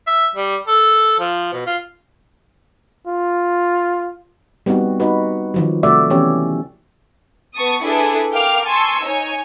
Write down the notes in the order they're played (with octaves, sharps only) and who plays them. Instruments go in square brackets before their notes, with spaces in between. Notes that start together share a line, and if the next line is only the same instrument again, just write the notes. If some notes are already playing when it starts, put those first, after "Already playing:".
[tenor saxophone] E5
G3
A4
F3
B2
F4
[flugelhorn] F4
[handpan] G3 B3 C4 D#4 F#4
D#4 F#4 B4
D#3 F3 F#3
C3 A3 F#4 D5 E5
E3 B3 C#4 G4 C#5
[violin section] B3 A5 C#6 D#6
D4 E4 G#4 A4 B4
A#4 F5 G5 D6 F6
G#5 A5 C6 C#6 E6
D#4 C#5 G#5